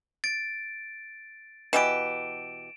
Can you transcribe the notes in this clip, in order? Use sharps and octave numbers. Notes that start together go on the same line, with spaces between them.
A6 D7
B2 E3 G4 D7 E7